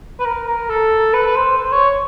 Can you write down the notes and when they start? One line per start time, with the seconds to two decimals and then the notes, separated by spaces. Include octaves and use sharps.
0.20 B4
0.25 A#4
0.47 A#4
0.69 A4
1.14 B4
1.26 B4
1.36 C5
1.58 C5
1.73 C#5